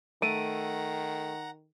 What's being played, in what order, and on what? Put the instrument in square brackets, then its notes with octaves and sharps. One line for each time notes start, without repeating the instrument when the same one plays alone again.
[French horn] D#3 [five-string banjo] A3 [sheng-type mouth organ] F#5 A#5 [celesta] D7 D#7